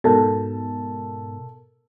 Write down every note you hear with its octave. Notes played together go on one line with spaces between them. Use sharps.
G#2 B2 A4 A#4 A5